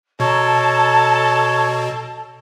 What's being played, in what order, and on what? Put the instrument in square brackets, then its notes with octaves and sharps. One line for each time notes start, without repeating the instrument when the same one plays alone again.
[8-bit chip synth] B2 [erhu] A4 [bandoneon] C#5 [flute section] A5 A#5